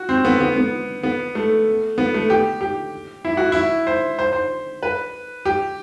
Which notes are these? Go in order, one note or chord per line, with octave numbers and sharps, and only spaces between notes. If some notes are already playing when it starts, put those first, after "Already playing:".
Already playing: F#4
C4
B3
B3
B3
B3
A3
B3
A3
G4
G4
E4
F#4
E4
C5
C5
C5
B4
G4